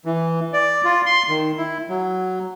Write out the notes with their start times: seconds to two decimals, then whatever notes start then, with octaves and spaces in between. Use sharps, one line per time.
0.05 E3
0.53 D5
0.85 F4
1.06 C6
1.29 D#3
1.57 E4
1.89 F#3